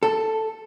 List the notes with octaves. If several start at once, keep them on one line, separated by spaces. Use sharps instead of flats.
A4